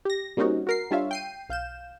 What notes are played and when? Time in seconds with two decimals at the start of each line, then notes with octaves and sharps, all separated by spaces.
0.05 G4 A#6
0.37 G3 A#3 C4 C#4 D#4 F#4
0.67 F#4 A#4 C7
0.91 G3 D4 F4 C#5 E5 F5
1.11 G5 C7 D#7
1.49 B1 F5 G6 E7